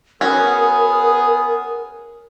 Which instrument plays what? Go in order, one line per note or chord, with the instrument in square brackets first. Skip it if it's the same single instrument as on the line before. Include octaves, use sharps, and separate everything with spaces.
[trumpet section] B3 G#4 [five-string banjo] C#4 F#4 [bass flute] A#4